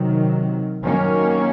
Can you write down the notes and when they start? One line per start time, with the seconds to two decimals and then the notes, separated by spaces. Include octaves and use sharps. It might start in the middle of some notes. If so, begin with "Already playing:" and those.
Already playing: C3 D#3 F#3
0.84 D#3 F#3 A#3 C#4